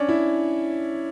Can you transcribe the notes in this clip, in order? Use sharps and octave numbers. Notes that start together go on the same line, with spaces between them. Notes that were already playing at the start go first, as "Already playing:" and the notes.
Already playing: C#4 D4
E4